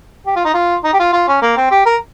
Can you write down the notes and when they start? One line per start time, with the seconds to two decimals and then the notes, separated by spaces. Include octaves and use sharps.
0.26 G4
0.36 F4
0.45 D#4
0.54 F4
0.84 D#4
0.93 G4
0.99 F4
1.13 F4
1.28 C#4
1.42 A#3
1.57 C4
1.71 G4
1.86 A#4